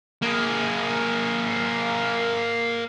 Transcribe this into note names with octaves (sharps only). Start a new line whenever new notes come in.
A#3 G#4